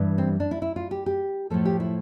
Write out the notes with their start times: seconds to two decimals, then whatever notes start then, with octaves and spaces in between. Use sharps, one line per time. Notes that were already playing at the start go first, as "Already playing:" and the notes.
Already playing: G2 E3 G3
0.18 C4
0.40 D4
0.51 E4
0.62 E4
0.76 F4
0.91 G4
1.06 G4
1.50 A2 F3 A3 A4
1.65 G4
1.80 E4